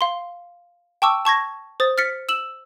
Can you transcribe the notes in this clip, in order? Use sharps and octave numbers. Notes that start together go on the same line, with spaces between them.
F5 C6
G5 A5 C#6 D6 E6
A5 C#6 G#6 A#6
C5 D#6 A6
F6 A6 B6 C#7
E6 E7 F#7